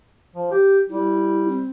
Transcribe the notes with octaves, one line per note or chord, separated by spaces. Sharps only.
F3
G4
G3 E4
C4